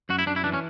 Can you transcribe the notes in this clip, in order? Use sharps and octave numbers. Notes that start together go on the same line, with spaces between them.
F#2 F#4
E4
F#2 D4
E4
E3 D4
C#4